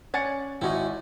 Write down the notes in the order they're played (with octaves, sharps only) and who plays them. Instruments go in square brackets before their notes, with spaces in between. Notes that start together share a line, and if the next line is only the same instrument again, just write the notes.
[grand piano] C#4 A6 C#7 [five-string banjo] D5 F#5 G#5
[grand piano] G#1 [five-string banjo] C4 C#4 D#4 [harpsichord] E4 F#4